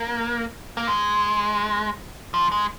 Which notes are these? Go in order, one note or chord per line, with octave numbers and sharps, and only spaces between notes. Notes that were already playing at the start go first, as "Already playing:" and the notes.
Already playing: A#3
A#3
G#3
F3
G#3